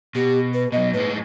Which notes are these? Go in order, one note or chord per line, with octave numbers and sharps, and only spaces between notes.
B2 G4
B4
B2 F#3 D#5
A2 G#3 B4